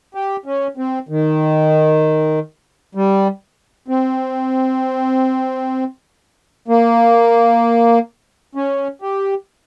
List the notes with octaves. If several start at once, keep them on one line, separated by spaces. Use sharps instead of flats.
G4
C#4
C4
D#3
G3
C4
A#3
C#4
G4